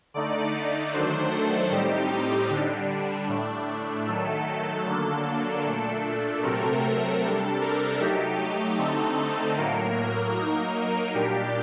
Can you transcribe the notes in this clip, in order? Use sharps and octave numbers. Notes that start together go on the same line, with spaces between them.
D3 A3 D#4 D5
D#3 F#3 A3 D4 C5
A4
A2 G3 C4 D#4 G4
D3 G3 D4
A2 A3 D4
D#3 F#3 A3 A4
D3 F#3 A#3 D4
A#2 A3 D4
C3 F#3 A3 C4 A#4
C3 G3 D4 A4
A#4
F#3 A3 D#4 G4
D3 A3 C4 D#4 A4
A2 F#3 A#3 A#4
F#3 A#3 D#4
A#2 G3 D4 G4